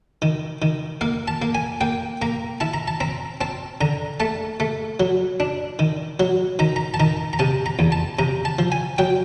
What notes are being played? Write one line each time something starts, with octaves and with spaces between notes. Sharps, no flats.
D#3
D#3
A#3 F5
A5
A#3
G#5
A#3 G5
A#3 A#5
E4 A5
A#5
A5
C4 A#5
C4 A5
D3 A#5
A3 A5
A3
F#3
D4
D#3
F#3
D#3 A#5
A#5
A5
D#3 A#5
A#5
C3 A5
A#5
E2
A5
C3 A#5
A5
F3
G#5
F#3 G5